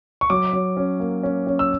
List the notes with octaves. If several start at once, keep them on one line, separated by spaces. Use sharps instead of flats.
C#6
F#3 D6
F#3
C#4
A#3
C#4
C#4
E6